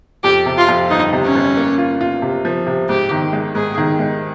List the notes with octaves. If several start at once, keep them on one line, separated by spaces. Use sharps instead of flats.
F2 G4
C3
F4
F2
G1 D#4
C3
C#4
G1
A#3
F4
F4
C3
F3
C3
G#2 G4
D#3
G#3
G#2 G#4
D#3
G#3